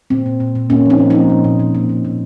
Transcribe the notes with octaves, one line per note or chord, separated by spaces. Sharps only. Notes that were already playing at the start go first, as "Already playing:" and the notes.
A#2 C4
A#2
A#2
A#2
A#2 A#3 C#4
F3 C4 D#4
A#2
F3 C4 D#4
A#2
A#2
A#2
A#2
A#2
A#2